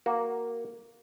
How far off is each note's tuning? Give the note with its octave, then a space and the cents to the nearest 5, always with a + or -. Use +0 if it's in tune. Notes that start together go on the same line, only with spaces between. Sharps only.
A#3 +0 F#4 +0